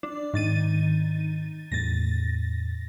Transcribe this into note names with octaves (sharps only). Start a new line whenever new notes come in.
D4
G#2 D#3 C4 A6 D#7
E2 A2 A6 A#6